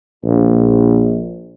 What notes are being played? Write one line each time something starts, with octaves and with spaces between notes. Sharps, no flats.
A#1